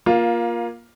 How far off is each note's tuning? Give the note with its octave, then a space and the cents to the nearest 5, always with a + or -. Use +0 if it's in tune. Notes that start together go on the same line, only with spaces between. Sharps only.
A#3 +20 F4 +5